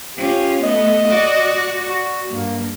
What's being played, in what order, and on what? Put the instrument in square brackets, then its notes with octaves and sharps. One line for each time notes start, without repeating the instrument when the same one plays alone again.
[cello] C#4 F4 [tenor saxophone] G4
[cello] A3 B3 [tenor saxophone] D#5
[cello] F#4 D5
[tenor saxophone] F#4
[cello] G2 [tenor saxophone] A#3